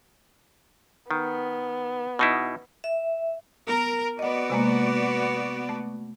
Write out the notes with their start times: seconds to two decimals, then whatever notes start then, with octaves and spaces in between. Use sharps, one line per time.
1.11 D#3 B3
2.19 B2 D#4 E4
2.84 E5
3.68 B3 A#4
4.19 B3 F#4 D5 D#5 F#5
4.50 C3 G#3 A#3
5.69 A3